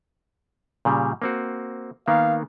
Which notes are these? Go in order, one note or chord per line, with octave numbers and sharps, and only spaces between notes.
A#2 C#3 G3
A#3 C4 F#4
D#3 A#3 B3 F5